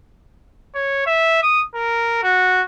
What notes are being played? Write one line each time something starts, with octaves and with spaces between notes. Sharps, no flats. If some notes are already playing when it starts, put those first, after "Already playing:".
C#5
E5
D#6
A#4
F#4